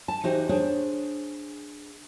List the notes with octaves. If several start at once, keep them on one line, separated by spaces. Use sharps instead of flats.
A5
E3 D#4 F#4 G4 C5
D4 G#4 C5 C#5